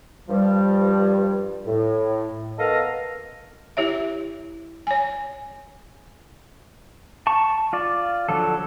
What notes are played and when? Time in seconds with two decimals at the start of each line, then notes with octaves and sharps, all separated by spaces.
0.29 G2 F3 G3
1.66 A2
2.59 A3 B3 A4 A#4 D#5 F5
3.77 E4 G4 C#5 E5
4.87 C#5 G#5
7.27 A5 C#6
7.73 F4 D5
8.29 D3 F3 F#3 A4